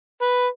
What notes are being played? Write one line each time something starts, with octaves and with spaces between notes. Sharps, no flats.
B4